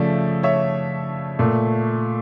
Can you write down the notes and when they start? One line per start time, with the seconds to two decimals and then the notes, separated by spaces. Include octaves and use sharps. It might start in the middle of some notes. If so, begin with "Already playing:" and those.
Already playing: C#3 F3 A3 D5 E5
0.43 C#5 E5
1.39 A#2 A3